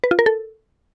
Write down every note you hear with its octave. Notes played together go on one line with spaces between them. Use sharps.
B4
F4
A#4
A4